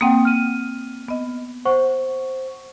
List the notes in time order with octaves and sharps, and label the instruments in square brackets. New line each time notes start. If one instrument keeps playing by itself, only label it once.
[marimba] A#3 C4 [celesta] F#5 G5 D#6
[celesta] F6 D#7
[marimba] B3 D#5
[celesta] C5 F#5 C#6